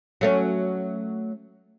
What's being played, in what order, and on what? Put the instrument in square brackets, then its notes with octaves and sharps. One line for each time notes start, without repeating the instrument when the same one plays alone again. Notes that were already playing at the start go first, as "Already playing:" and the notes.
[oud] F#3 A3 C#4